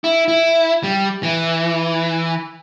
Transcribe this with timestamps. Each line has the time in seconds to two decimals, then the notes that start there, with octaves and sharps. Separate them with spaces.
0.04 E4
0.28 E4
0.83 G3
1.23 E3